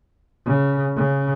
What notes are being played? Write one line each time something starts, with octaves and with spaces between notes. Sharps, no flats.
C#3
C#3